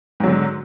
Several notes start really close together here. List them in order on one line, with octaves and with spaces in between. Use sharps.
G#2 F#3 D3